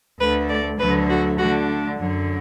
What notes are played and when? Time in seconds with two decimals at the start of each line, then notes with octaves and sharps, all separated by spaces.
0.19 D2 D3 A3 B4
0.49 D5
0.79 D2 D3 F#3 A3 B4
1.09 F#4
1.39 D3 A3 D4 F#4
1.99 F#2 D3 F#3